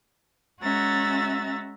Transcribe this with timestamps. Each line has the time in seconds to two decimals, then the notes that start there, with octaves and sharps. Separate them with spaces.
0.61 G#3 C#4 F#4 E5 A#5 A6